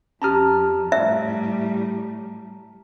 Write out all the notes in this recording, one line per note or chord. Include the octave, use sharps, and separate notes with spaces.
F2 C#4 G4 A5 A#5 F6
A2 G3 E5